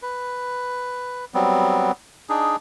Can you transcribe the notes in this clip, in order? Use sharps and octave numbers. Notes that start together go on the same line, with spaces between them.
B4
F#3 G3 B3 C4
D4 D#4 G#4